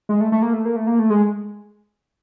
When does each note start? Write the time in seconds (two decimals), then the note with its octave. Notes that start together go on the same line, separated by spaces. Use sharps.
0.09 G#3
0.21 A3
0.32 A3
0.42 A#3
0.53 A3
0.65 A#3
0.76 A3
0.87 A#3
0.99 A3
1.10 G#3